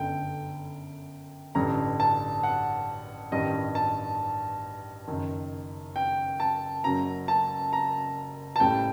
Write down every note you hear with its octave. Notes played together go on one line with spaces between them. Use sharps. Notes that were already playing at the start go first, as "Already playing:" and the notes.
Already playing: G1 F#2 D3 G5
A1 G2 D3 G3 A#5
A5
F#5
A1 G2 D#3 G3 D#5
A5
F#1 F#2 D#3
G5
A5
F#1 F#2 F#3 A#5
A5
A#5
A5
A1 A2 G3 G5